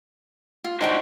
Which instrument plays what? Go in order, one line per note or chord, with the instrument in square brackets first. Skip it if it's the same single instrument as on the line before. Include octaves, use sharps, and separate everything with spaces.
[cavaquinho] F4
[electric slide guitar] D4 F#4 C5 [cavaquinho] D#4 G5 C#6